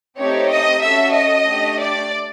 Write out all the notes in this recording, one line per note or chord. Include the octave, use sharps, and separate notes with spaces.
A3 C4 D#4 G4 C#5
D#5
C#4 F#4 A4 E5
D#5
A3 D4 G4
D5